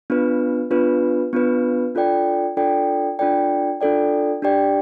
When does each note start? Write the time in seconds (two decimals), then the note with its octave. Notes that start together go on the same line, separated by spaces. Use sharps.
0.10 B3 D4 F4 B4
0.71 B3 D4 F4 B4
1.33 B3 D4 F4 B4
1.95 D4 F4 A4 D5 G5
2.57 D4 F4 A4 D5 G5
3.19 D4 F4 A4 D5 G5
3.81 D4 F4 A4 D5 G5
4.42 D4 G4 D5 G5